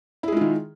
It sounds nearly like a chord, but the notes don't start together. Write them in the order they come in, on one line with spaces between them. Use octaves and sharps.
E4 G#4 G#3 F4 D#3